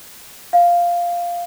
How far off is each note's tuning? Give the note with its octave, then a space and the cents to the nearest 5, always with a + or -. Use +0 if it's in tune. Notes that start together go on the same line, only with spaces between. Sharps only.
F5 -5